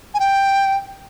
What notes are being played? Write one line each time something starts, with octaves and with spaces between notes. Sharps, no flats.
G#5
G5